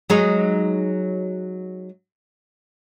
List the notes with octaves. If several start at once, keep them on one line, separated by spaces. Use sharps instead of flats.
F#3 G#3 D#4